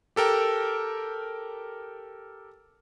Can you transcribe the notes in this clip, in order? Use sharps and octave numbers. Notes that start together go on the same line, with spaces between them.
G4 A4 A#4 G5